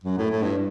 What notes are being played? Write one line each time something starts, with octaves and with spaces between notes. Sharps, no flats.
F#2
A2
A2
G2